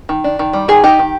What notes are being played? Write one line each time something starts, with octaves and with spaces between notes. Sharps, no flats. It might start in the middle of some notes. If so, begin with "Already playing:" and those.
D#3
D4
D#3
G3
D#3 G#4
D#4 G4
D#3